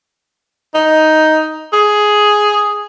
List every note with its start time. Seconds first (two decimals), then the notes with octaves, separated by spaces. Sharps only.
0.74 D#4
1.73 G#4